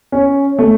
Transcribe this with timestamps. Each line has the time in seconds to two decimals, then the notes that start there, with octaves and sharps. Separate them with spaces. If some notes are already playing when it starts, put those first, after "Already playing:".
0.12 C#4
0.59 A3